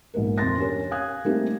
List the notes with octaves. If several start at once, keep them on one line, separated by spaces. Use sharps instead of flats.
A#1 G#2 A#3 B3 A#4
F2 C3 A#4 C6 A6 A#6
C#4 D4 G4 A#4 C#5
F5 G#5 D#6 F#6 G#6
G3 A3 A#3 C4 D#4 G4